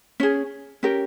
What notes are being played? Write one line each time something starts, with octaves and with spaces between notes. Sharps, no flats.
C#4 G#4
C#4 G4 A#4